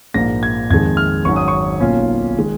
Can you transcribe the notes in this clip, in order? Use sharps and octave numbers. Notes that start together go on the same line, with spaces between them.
A#1 G#2 F3 A#3 A#6
G#6
F2 D#3 G#3 G#6
F6
G#1 G#2 F#3 C#4 C#6
D#6
C#6
B1 B2 A#3 C#4 F4
D#3 G#3